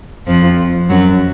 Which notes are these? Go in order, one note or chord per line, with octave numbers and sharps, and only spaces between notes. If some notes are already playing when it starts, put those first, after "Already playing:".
F2 F3
F#2 F#3